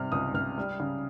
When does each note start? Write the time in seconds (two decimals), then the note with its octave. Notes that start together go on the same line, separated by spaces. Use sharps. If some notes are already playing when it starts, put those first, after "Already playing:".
Already playing: C3 G3 F6
0.12 C#2 D#6
0.34 C#2 F6
0.58 G3
0.80 C#3